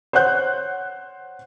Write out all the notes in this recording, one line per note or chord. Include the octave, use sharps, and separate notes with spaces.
C5 C#5 F#5 F#6 G6